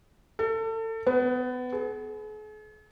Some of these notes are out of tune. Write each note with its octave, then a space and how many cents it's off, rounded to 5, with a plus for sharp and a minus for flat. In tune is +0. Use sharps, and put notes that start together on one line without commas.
A4 +30
B3 +25
G#4 +45